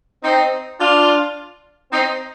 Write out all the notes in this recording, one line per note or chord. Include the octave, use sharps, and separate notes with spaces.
C4 D#4
D4 F4
C4 D#4